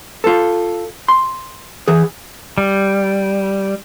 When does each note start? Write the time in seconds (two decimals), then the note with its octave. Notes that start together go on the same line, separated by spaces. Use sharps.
0.24 F4 A4
1.08 C6
1.88 E3 G#4
2.58 G3